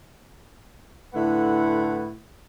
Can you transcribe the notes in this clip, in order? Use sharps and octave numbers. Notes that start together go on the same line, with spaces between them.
A2 D3 E4 B4 F#5